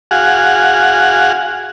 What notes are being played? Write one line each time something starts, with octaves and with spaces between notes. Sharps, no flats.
F#4 G#4 F5 F#5